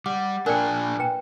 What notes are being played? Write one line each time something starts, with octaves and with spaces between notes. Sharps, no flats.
G3 F#5 D6
A#2 D4 A#4 D5 G5 G#5 F6 F#6
B4 G5 A#5